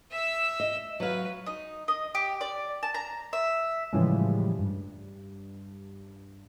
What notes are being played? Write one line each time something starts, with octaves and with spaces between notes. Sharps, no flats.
E5 E6
D#5
F#3 B4 F5
D#4
D#5
G4
D5
A5
A#5
E5
A2 C#3 E3 F3 G3 G#3
G2